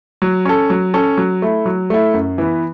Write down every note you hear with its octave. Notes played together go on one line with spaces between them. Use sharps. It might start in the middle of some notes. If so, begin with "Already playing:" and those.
F#3
C#4 A4
F#3
C#4 A4
F#3
A3 E4
F#3
A3 E4
F#2
E3 B3